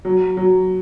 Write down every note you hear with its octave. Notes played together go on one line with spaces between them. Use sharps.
F#3
F#3